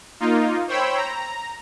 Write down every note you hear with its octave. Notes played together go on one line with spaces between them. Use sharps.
A#3 D#4 F4
C5 C#5 G5 B5 E6
A#5